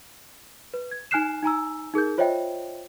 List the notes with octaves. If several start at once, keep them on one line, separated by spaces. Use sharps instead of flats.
B4
G#6
D#4 G#5 F6 F#6 C7 E7
D#4 G#5 A#5 E6
D#4 G#4 A#4 G6
F4 C5 C#5 D#5 E5 G5